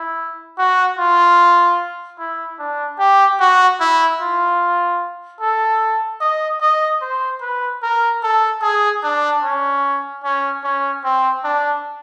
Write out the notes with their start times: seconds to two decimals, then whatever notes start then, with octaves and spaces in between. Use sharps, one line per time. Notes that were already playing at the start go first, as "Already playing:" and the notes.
Already playing: E4
0.58 F#4
0.98 F4
2.19 E4
2.59 D4
2.98 G4
3.40 F#4
3.80 E4
4.20 F4
5.41 A4
6.20 D#5
6.61 D#5
7.01 C5
7.41 B4
7.82 A#4
8.23 A4
8.62 G#4
9.03 D4
9.43 C#4
10.24 C#4
10.64 C#4
11.04 C4
11.44 D4